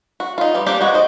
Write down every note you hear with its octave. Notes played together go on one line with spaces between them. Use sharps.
F#4
D#4 F4
E3 G3
G3 A#3 C4 D4 G4
G#3 B3 F#4
C5 D#5 G5